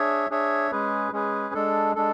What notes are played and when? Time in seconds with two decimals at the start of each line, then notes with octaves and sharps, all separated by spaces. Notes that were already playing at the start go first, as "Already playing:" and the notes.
Already playing: D4 G#4 C#5 E5
0.30 D4 G#4 C#5 E5
0.71 G#3 C#4 G#4 B4
1.12 G#3 C#4 G#4 B4
1.54 G#3 D4 A4
1.95 G#3 D4 A4